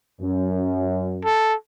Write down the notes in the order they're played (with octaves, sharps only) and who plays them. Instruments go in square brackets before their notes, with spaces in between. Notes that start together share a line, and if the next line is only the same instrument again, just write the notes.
[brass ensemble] F#2
[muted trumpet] A4